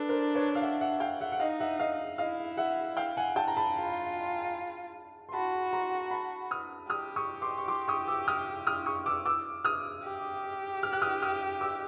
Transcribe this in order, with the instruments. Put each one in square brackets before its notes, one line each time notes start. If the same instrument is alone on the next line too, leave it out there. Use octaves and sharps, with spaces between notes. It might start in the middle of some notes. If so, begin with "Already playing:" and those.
Already playing: [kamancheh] D4 [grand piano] A4 B4
[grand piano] A#4 C5
B4 C#5
F5
E5 F#5
E5 F#5
F5 G5
E5 F#5
F#5
[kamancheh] D#4 [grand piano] D#5 F5
[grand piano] E5 F#5
D#5 F5
[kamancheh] E4 [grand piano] D#5 F5
[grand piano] E5 F#5
F5 G5
F#5 G#5
G5 A5
A#5
A5 B5
[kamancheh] F4
[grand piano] C6
[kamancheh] F#4 [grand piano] A5 B5
[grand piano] A#5 C6
A5 B5
D#6 F6
[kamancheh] G4 [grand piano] D#6 F6
[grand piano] C#6 D#6
C6 D6
C#6
C6 D6
C#6 D#6
D6 E6
D#6 F6
D#6 F6
C#6 D#6
D6 E6
D6 E6
D#6 F6
[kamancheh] G4
[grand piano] F6
F#6
D#6 F6
D#6 F6
D6 E6